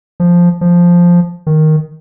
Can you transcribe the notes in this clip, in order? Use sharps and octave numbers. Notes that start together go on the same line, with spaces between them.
F3
F3
D#3